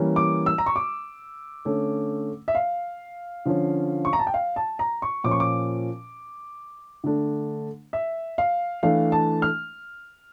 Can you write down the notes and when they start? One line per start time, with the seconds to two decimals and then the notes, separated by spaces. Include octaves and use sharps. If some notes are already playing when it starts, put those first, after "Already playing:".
Already playing: E3 G3 A#3 C#4
0.16 D6
0.46 E6
0.58 A#5
0.66 C#6
0.76 D6
1.65 D3 A3 C#4
2.48 E5
2.55 F5
3.45 D3 F3 C#4
4.05 C#6
4.13 A#5
4.19 A5
4.27 G5
4.34 F5
4.56 A5
4.79 A#5
5.02 C#6
5.24 A#2 F3 C#4 D6
5.31 C#6
5.40 D6
7.04 D3 A3 D4
7.93 E5
8.38 F5
8.83 E3 A3 D4 F5
9.12 A5
9.42 F6